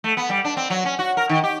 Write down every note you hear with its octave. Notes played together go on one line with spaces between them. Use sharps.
A3
B3
G3
D4
C4
F#3
C#4
F#4
A#4
D#3
G4